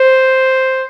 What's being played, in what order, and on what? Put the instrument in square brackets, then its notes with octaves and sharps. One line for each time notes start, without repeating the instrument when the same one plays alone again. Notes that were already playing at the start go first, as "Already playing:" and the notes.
Already playing: [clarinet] C5